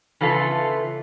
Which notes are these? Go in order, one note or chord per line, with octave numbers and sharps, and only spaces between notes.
C#3 E3 A3 F4 A4